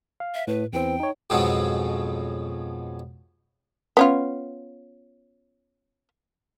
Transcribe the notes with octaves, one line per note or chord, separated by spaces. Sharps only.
F5
E5
A2 B4
E2 E3 C4 G5
D#4 C#5
F2 G#2 B2 F3 F#3 C#4
B3 C#4 F4